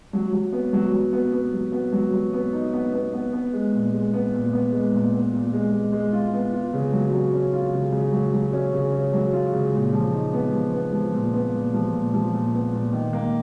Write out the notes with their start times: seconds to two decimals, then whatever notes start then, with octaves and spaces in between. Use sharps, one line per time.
0.13 F#3
0.32 F#3
0.52 B3
0.73 F#3
0.92 F#3
1.13 B3
1.32 B3
1.53 F#3
1.72 B3
1.92 F#3
2.13 F#3
2.33 B3
2.53 D#4
2.73 B3
2.93 B3
3.13 B3
3.32 B3
3.53 G#3
3.73 A#2
3.92 G#3
4.13 B3
4.33 A#2
4.53 B3
4.72 G#3
4.93 A#2
5.12 B3
5.33 A#2
5.53 G#3
5.73 G#3
5.92 G#3
6.13 F4
6.33 B3
6.53 F4
6.73 C#3
6.92 F#3
7.12 F#3
7.33 C#4
7.53 F4
7.73 C#3
7.92 C#3
8.12 F#3
8.33 F#3
8.53 C#4
8.73 C#3
8.92 C#4
9.13 F#3
9.33 F4
9.53 C#3
9.73 A#2
9.93 F3
10.12 D#4
10.33 B3
10.53 F3
10.73 B3
10.92 F3
11.14 A#2
11.34 B3
11.54 A#2
11.73 F3
11.93 A#2
12.13 F3
12.33 A#2
12.53 B3
12.73 A#2
12.92 D#3
13.13 A#3